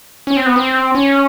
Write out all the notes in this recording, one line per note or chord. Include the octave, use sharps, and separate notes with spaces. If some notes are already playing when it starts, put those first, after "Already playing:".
C#4
C4
B3
C4
C#4